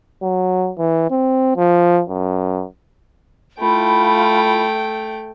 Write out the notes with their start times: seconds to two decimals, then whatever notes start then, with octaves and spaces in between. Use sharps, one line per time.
0.22 F#3
0.78 E3
1.11 C4
1.57 F3
2.09 F#2
3.59 A3 E4 F4 G5 B5